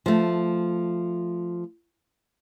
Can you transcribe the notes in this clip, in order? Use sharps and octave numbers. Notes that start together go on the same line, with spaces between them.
F3 A3